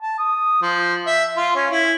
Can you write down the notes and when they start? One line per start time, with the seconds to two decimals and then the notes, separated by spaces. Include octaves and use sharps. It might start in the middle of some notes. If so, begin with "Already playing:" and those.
0.01 A5
0.18 D#6
0.62 F3
1.06 E5
1.37 F4
1.55 C#4
1.71 E4